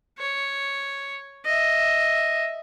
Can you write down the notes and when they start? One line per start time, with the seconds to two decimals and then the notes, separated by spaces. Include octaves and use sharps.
0.18 C#5
1.45 D#5 E5